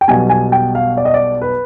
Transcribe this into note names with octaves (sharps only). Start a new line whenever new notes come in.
G5
B1 B2 G3 B3 G#5
G#5
G5
F5
D5
D#5
D5
B4